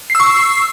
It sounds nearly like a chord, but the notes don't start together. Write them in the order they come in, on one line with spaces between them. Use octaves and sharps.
C7 E6 C#6